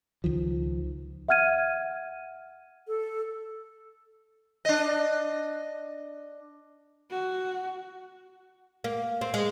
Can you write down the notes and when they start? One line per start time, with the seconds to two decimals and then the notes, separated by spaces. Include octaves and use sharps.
0.24 C#2 D#3 F3
1.29 E5 F#5 F6 G#6 D#7
2.87 A4
4.65 D4 D#5
7.11 F#4
8.84 A#3
9.21 C4
9.34 G#3